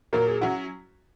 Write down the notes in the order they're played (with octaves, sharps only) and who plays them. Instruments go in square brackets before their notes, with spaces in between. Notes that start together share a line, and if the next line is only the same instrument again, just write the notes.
[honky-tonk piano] A#2 F#3 A#3 [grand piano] A#4
[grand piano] G#4
[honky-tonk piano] F#3 C#4 E4 [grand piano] F#4